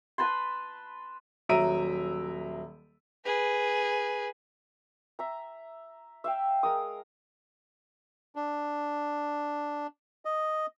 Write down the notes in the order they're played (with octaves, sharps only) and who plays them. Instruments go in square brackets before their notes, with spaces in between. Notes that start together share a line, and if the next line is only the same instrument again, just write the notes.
[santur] B4 A5 B5 C6
[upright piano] D#1 F#3 E5 A#5 D7 D#7
[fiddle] G#4 B4
[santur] E5 A#5
E5 F5 G5
G#3 A#4 D#6
[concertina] D4
D#5